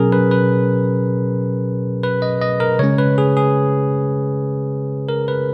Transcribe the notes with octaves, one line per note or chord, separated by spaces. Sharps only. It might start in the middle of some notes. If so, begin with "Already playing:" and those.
Already playing: B2 F#3 C#4 G#4 A#4
B4
B4
B4
D#5
D#5
A#4
C#3 G#3 C#4 C#5
B4
G#4
G#4
A#4
B4